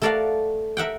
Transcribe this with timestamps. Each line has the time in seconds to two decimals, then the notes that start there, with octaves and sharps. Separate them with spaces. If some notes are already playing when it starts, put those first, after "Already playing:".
0.02 A3 A4 A#4 D5 F5 F#5
0.77 A#4 E5 F#5 G5